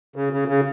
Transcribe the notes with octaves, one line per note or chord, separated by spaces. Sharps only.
C#3
C#3
C#3